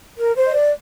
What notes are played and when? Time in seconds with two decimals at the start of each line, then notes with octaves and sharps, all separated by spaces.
0.17 A#4
0.36 C5
0.46 D#5
0.54 D5